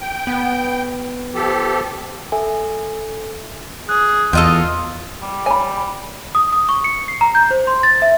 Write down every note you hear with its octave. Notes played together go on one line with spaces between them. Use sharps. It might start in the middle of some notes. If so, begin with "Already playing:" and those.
G5
B3
F3 G4 A4
A4 E5 G#5
G#4 F#6
E2 F4 A4 D#5 G5
G3
C#5 G#5 B5
D#6
D#6
C#6
C#7
C7
A#5
G6
C5
C6
A6
E5